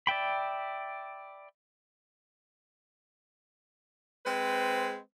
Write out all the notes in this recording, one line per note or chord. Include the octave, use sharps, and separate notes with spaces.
D5 E5 G5 B5
G#3 C4 B4 C5